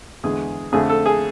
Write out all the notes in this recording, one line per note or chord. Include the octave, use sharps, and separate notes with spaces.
E2 D3 G#3 G#4
F2 D3 A3 G#4
A4
G#4